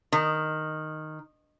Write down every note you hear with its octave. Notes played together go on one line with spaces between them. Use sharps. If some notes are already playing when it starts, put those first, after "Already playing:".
D#3